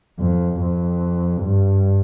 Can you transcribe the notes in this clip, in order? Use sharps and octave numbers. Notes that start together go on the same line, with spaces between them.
F2
F2
G2